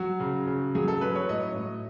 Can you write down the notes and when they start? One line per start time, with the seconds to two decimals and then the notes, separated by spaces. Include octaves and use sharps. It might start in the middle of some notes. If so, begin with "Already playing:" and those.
Already playing: F#3 F#4
0.20 C#3
0.47 C#3
0.75 F#3 G#4
0.88 A4
1.01 F#3 B4
1.15 C#5
1.29 A2 D#5
1.56 A2